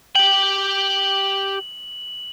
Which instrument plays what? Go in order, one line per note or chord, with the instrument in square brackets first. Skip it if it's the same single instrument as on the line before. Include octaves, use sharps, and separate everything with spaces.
[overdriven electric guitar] G4 G5 [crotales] F#7